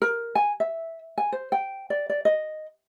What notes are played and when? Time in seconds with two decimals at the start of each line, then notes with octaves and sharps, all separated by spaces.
0.02 A#4
0.35 G#5
0.60 E5
1.18 G#5
1.32 C5
1.52 G5
1.90 D5
2.09 D5
2.25 D#5